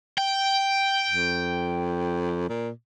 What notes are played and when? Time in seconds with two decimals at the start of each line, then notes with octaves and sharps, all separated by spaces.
0.18 G5
1.11 F2
2.49 A#2